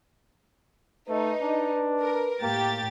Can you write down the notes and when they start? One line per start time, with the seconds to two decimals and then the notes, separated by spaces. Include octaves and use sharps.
1.09 A3 D#4 B4
1.41 D4
1.98 A#4
2.42 A2 A#3 G4 A6